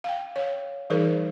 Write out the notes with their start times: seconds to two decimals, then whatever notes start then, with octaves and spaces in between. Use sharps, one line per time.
0.04 F5 G5
0.36 C#5 F5
0.90 E3 G3 D#4 G#4 A#4 C5